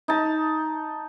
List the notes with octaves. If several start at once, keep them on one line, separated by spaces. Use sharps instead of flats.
D#4 A5